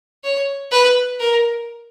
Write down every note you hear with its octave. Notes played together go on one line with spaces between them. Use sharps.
C#5
B4
A#4